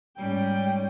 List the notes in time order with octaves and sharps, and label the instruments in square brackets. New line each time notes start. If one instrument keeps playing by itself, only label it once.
[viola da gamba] G#2 G3 [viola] C#4 G5